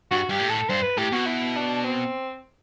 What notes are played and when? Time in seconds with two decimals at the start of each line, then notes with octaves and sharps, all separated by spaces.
0.11 G2 F#4
0.29 G2 G4
0.40 A2
0.50 A4
0.69 G2 C5
0.83 B4
0.97 A2 G4
1.12 B2 F#4
1.27 E4
1.56 D4
1.84 C4